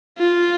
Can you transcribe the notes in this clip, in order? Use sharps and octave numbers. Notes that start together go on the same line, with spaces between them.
F4